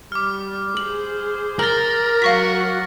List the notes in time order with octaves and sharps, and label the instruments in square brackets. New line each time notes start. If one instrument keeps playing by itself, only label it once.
[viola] G3 [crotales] D6 F6
[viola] G#4 C5 [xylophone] F#7
[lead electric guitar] A#4 [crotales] F6 A6 [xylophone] F#7 G7
[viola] F#3 F#5 [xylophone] F5 C#6 B6 [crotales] A#6